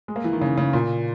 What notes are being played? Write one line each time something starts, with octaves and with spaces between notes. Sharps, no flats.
G#3
A#3
E3
D#3
C#3
C#3
A#2